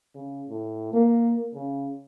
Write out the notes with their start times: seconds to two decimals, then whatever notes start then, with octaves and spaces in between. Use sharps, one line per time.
0.15 C#3
0.49 A2
0.93 A#3
1.55 C#3